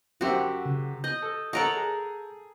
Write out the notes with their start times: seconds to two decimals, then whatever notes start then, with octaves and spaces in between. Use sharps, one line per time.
0.21 F#2 F#4 G4 C5 E5
0.65 C#3
1.04 D#5 G6
1.22 A4
1.53 A4 A#4 C#5 D#5 F#5 A#5
1.76 G#4